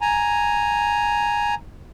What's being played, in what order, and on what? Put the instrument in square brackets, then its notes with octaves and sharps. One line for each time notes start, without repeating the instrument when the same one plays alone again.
[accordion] G#5 A#5